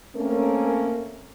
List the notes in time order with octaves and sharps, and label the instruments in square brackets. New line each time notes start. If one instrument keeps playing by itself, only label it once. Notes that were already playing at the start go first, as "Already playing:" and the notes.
[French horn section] A3 A#3 C4 C#4 A#4